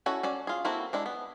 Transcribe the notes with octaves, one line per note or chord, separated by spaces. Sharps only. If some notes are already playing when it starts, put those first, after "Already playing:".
C#4 E4 F#4 A4
C#4 F#4 D5
F4 G#4
A#3 C4 E4 F#4 A4
G#3 D4 E4
B3